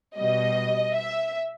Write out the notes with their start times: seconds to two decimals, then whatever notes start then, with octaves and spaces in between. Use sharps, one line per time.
0.17 B2 G3 D#5
0.95 E5